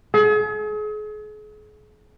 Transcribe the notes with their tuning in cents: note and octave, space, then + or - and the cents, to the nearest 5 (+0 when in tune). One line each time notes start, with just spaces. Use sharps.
G#4 +40